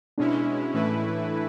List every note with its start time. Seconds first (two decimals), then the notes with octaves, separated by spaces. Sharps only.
0.18 B2 G#3 C#4 D4 E4
0.73 A2 E3 A3 E4 B4